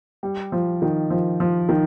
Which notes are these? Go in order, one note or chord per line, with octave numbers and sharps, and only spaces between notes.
G3
F3
D#3
F3
F3
D#3